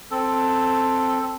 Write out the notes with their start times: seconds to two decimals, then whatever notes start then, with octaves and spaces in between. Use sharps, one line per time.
0.11 C4 A4